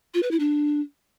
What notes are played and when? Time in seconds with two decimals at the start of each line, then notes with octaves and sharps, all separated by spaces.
0.14 F4
0.23 B4
0.31 E4
0.40 D4